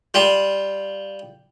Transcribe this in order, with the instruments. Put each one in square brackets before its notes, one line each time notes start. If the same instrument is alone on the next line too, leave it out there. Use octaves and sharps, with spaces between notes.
[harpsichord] G3 F4